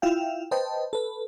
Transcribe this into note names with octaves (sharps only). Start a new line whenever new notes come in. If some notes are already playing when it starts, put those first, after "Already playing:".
E4 F4 E5 F5 G5
B4 C5 D#5 G5 A5
A4 B4